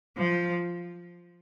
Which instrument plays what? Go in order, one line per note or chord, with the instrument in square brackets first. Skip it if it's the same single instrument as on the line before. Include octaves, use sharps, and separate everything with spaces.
[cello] F3